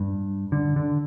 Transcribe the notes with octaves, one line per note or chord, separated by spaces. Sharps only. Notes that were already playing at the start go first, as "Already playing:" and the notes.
Already playing: G2
D3
D3